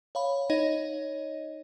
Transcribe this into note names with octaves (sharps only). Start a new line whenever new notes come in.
C#5 F5 B5
D#4 C#5 D#5